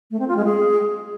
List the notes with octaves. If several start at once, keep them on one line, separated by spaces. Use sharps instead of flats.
A3
C4
F4
G#3
G#4